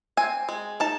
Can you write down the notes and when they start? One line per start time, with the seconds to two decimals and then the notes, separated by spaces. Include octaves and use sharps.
0.17 C4 G#5
0.49 G#3
0.80 D#4 A5